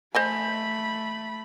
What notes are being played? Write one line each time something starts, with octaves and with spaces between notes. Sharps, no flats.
A3 C5 D#5 G#5 B5